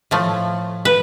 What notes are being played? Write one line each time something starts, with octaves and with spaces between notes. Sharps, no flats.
A2 F3 A3
B4